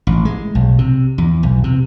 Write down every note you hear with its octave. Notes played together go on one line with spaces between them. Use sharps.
A1
G#3
B1
C3
E2
B1
C3